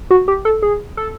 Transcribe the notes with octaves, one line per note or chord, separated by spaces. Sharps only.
F#4
G4
A4
G#4
A4